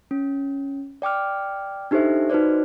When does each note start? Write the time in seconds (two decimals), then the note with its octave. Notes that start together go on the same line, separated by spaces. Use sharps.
0.11 C#4
1.02 D5 G5 D6 F6
1.91 D4 D#4 G4 A4 C5 E5
2.30 D#4 F#4 B4 C5 D5